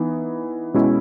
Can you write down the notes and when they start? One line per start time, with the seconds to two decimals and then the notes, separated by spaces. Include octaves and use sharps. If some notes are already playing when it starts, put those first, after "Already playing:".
Already playing: E3 B3 D#4
0.74 B2 G#3 C#4 E4